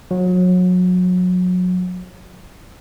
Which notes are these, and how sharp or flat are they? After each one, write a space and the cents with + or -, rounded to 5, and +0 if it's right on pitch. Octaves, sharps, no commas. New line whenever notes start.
F#3 -30